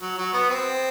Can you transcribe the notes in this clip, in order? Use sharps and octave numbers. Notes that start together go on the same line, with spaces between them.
F#3
F#3
B3
C4